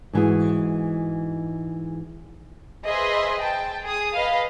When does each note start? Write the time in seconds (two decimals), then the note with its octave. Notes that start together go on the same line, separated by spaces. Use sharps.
0.13 G#2 E3 F#4 G#4
2.86 G#4 B4 C5 D#5 E5 C6
3.40 G5 A5
3.83 G#4 D#6
4.14 B4 D#5 F5